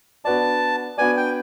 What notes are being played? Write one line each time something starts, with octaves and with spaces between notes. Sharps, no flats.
B3 D4 F#4 B4 D5 A5
B3 D4 F#4 B4 D5 G#5
G5